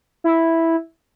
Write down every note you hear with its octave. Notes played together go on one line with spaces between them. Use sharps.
E4